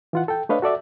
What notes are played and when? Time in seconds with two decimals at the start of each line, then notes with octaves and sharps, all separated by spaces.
0.13 E3 F4 F#5
0.28 A4 G5
0.49 A3 D4 B4 C#5 D#5 F5
0.62 F#4 A4 D5 E5